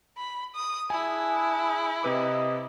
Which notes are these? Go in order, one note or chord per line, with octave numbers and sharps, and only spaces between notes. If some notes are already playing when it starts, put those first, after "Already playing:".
B5
D#6
D4 E4 G#4 G#5
C3 B4 D#5 D6